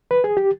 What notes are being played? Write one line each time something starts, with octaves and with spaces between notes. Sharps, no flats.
B4
G#4
G4